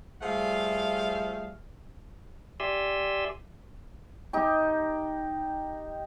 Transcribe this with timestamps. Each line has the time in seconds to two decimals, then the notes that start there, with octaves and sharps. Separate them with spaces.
0.22 F3 G3 A3 G#4 F5
2.60 G4 D5 E5 G#5 C6 E6
4.33 D#4 G4